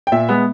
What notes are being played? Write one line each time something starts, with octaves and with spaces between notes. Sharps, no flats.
G5
A#2 E5
G#3 B3